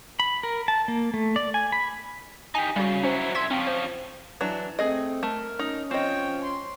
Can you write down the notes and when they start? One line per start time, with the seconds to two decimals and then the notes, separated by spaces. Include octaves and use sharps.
0.20 B5
0.43 A#4
0.68 A5
0.88 A#3
1.14 A3
1.36 D5
1.54 G#5
1.72 B5
2.55 D#4 G4 G#5
2.76 C#3 G3 F#4
3.03 F#3 C#4 E4 C5
3.35 C2 E5 C6 G#6
3.51 F3 C4 C#4
3.67 C5
4.41 E3 F#3 D4
4.79 A3 C4 G#4 D#5
5.23 A3 A#4
5.59 C#4 D#4
5.91 F3 C4 C#5 D#5 G5
6.44 C6